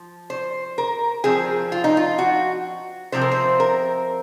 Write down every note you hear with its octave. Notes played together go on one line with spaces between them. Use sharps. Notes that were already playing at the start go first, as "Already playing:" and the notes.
Already playing: F3
C5
A#4
F3 C4 G#4
F4
D#4
F4
F#4
C3 F3 C4 C5
A#4
C5
A#4